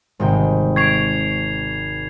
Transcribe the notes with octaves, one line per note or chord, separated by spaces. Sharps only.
G#1 C3 G5
C#6 G#6 C7 D7 F7